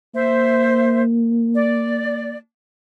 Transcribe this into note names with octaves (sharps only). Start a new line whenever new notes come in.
A#3 C5 E5
D5